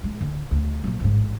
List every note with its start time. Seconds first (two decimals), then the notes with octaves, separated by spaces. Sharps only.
0.04 A2 G#3
0.21 D1 D3
0.51 D2
0.84 A#2 F#3
1.00 A1 G#2